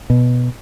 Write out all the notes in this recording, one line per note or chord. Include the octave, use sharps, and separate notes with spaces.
B2